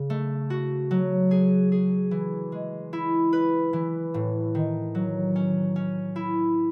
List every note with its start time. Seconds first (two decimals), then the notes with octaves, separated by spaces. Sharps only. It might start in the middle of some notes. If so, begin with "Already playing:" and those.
Already playing: C#3
0.10 A3
0.50 F#4
0.91 F#3
1.31 G#4
1.72 G#4
2.11 E3
2.52 G#3
2.93 E4
3.33 B4
3.73 E3
4.14 A2
4.55 D#3
4.95 F#3
5.36 C#4
5.76 C#4
6.16 E4